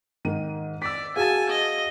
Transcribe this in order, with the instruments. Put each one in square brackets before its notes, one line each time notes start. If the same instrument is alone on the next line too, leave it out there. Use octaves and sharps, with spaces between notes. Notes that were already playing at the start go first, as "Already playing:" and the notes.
[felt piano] G#2 D#3 D#7
[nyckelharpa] D5 [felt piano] E6 B6
[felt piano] F#4 G#4 F5 [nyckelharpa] G#5 A5
[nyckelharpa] D#5